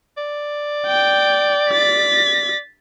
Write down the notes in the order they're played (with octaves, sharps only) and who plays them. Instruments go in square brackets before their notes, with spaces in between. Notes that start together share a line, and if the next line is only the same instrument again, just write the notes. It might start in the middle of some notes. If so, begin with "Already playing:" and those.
[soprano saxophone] D5
[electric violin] G5
A6 B6